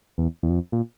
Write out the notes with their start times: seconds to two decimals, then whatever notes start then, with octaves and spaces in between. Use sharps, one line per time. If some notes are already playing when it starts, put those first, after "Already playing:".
0.18 E2
0.43 E2
0.50 F2
0.72 A#2